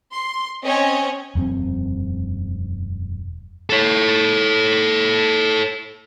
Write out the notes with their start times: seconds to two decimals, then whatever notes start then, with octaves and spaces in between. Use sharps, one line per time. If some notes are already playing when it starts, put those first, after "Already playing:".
0.13 C6
0.64 C4 C#4 C#5 D#5
1.35 E1 F#2 F3 C4
3.70 A4 C#5